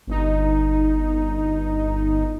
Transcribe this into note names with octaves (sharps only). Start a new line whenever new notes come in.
G1 D#4